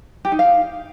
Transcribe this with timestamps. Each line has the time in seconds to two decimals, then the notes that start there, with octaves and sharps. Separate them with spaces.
0.25 G4
0.32 D#4
0.39 F5